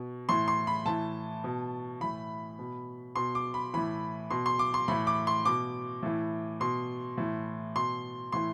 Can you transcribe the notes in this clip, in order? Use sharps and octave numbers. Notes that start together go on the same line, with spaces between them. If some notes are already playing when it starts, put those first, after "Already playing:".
Already playing: B2
A2 E3 C6
C6
B5
A2 E3 A5
B2
A2 E3 B5
B2
B2 C6
D6
B5
A2 E3 B5
B2 C6
C6
D6
C6
A2 E3 B5
D6
C6
B2 D6
A2 E3
B2 C6
A2 E3
B2 C6
A2 E3 C6